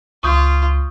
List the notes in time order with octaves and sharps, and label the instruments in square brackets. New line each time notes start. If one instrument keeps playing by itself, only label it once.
[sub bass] C#2 [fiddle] F4 [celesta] C#6 D#6 G6